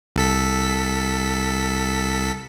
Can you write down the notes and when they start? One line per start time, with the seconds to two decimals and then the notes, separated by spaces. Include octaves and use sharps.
0.16 C2 A4 B6